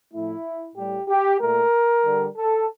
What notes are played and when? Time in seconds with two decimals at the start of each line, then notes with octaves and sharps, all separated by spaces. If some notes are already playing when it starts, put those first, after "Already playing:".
0.12 A2 F3 A3 E4
0.76 A2 G3 G4
1.08 G4
1.40 A#2 A3 A#4
2.04 D3 G3
2.36 A4